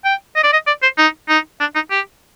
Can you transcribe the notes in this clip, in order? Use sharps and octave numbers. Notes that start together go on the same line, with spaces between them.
G5
D#5
D5
D#5
D5
C5
D#4
D#4
D4
D#4
G4